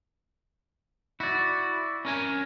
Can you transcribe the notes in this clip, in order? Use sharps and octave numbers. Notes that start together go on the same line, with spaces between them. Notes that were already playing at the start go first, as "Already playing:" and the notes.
E4 F#4 D5
C#4 A#4 G#5